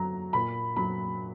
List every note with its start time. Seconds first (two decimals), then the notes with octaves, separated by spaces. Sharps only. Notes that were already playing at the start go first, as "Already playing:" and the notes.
Already playing: D3 F#3 A#5
0.33 A#2 B5
0.76 F#3 B5